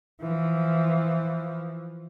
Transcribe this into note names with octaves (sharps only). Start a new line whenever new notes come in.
E3 F3